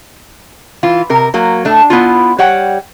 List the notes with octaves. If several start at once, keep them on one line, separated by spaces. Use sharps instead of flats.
E3 F4
C3 A#4
F#3 A#3
A2 A3 D4
B3 E4 F4
G3 C#5 F#5 G5